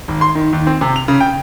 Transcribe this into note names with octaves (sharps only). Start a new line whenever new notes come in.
G#1
C6
D#3
D#2
C4
C3
F7
C#3
G5